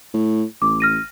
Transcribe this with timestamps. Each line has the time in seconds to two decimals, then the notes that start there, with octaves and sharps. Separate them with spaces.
0.14 A2
0.62 A1 D6
0.80 F6 A#6 D#7